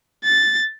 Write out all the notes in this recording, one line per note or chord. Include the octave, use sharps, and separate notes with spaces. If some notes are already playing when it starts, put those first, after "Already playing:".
A6